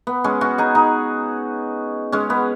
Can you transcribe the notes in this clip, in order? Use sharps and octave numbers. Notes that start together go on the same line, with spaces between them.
B3
G#3 C#4
C#4 F#4
D#4 G#4
D#4 G#4
G#3 C#4
B3